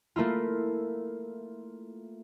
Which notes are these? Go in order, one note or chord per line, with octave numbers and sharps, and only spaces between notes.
A3 A#3 E4 F4